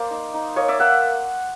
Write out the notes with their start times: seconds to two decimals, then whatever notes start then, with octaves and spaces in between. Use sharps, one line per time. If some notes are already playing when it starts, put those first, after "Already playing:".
Already playing: A#3 C5 D5
0.11 D#4
0.34 D#4
0.56 A#3 C#5 D#5
0.68 D5 E5
0.80 A#3 E5 F#5